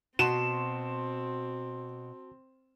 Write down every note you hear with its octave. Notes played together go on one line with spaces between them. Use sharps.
B2 C4 F#4 A5 C6 E7